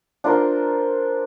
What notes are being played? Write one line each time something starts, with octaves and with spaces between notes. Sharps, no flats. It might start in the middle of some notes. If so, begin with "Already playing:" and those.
D4 F4 A#4 C5